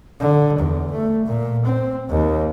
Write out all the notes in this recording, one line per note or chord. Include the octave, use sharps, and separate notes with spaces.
D3
E2
A3
A#2
C4
D#2